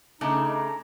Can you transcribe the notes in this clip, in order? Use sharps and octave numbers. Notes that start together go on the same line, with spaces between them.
C#3 A3 D4 D#4
A#5